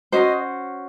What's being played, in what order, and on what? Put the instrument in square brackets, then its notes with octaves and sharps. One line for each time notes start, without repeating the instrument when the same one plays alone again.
[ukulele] C#4 F#4 C5 [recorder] D#5